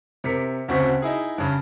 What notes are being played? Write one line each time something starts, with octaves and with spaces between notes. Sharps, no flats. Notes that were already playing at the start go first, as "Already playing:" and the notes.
C3 A#4 B6 C#7
D2 C#3 C4 F#4 C#6 B6
D#4 E4 G#4
G2 C#3